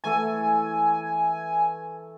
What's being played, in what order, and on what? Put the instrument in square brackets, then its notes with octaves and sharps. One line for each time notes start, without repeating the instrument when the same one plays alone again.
[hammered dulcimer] E3 A3 A4 [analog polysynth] G#5